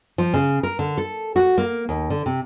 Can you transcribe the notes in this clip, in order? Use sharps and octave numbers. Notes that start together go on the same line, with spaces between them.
F3
C#3
A#4
D3
A4
F#4
A#3
D#2
D3
C3